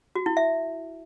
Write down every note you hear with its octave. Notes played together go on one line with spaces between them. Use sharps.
F#4
E4
E5